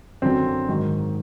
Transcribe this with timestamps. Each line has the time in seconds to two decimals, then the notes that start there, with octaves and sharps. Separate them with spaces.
0.22 F#2 D3 F#3 C4
0.68 G#2 D#3 F#3